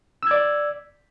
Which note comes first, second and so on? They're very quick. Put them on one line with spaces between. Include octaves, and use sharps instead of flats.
E6 G#6 D5